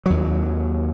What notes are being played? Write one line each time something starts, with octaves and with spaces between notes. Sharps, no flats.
D#2 F#3